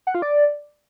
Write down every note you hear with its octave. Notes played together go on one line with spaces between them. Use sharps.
F#5
F4
D5